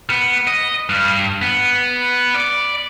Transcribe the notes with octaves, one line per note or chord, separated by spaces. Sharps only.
B3
D#5
G2
B3
D5